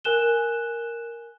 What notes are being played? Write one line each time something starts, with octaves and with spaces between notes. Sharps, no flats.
A#4 G#5 F#6 E7 G7